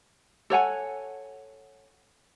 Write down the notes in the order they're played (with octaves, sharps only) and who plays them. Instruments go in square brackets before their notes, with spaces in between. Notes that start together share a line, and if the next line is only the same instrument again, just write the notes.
[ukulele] A4 C#5 F#5 G#5